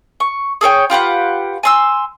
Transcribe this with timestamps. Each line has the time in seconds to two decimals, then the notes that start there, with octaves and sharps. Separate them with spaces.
0.20 C#6
0.61 G#4 A4 C#5 G5
0.90 F4 G4 B4 F#5
1.63 G#5 C6 E6